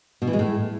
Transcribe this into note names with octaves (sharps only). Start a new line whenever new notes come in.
B2
E3
G#3
A2